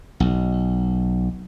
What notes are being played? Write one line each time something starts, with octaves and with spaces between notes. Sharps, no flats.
B1